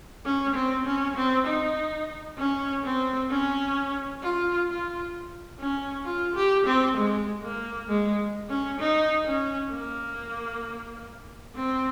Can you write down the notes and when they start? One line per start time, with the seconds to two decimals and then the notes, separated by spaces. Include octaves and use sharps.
0.25 C#4
0.55 C4
0.86 C#4
1.16 C4
1.47 D#4
2.38 C#4
2.84 C4
3.30 C#4
4.23 F4
4.68 F4
5.60 C#4
6.05 F4
6.35 G4
6.67 C4
6.97 G#3
7.42 A#3
7.88 G#3
8.49 C#4
8.80 D#4
9.26 C#4
9.72 A#3
11.56 C4